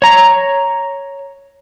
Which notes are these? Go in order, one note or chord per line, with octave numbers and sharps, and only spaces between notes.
C#5 A#5